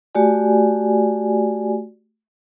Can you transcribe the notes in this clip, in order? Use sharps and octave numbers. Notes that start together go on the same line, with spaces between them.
A3 F#4 G4 D5 G#5